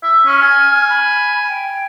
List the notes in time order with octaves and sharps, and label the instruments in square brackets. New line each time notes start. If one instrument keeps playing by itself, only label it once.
[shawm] E5
[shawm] C#4 [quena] F6
[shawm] G#5
[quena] B5
G5